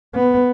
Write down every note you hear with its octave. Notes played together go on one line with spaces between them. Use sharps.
B3